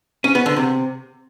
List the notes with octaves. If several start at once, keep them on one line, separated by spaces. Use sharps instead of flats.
C#4
B3
D3
C3